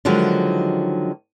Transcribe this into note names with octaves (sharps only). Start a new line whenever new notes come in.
D3 D#3 F3 F#3 G#3 E4